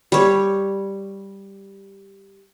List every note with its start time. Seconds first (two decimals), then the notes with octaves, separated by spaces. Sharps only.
0.12 G3 C#5